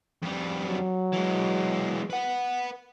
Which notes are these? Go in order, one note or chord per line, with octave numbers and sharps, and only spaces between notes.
F2 G3
F#3
E3 G#3
B4 F#5